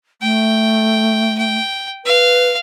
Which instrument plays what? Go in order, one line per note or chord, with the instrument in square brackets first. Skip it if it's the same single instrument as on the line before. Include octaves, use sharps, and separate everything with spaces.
[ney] A3 [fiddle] G5
[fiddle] G5
[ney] B4 [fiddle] F5